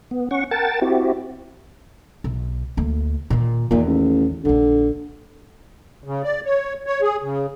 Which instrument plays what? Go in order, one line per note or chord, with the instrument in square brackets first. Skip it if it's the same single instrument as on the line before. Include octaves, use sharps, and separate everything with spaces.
[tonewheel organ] B3
C#4 F#5 C#6
A#4 F#5 G5 A5 A6
C4 E4 F#4 G4
[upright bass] B1
D2 A#3
A#2 D#3
[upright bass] E2 D#3 [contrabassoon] A#2
[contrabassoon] A1
[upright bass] A#1 D#3 [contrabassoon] D3
[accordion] C#3
D5
C#5
C#5
G#4
C#3